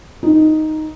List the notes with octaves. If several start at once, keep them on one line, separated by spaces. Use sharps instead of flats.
D#4